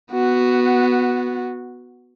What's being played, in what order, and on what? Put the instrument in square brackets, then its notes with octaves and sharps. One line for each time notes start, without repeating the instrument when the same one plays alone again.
[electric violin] B3 F#4